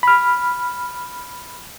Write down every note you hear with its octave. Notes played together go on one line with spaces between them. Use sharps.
B5 F6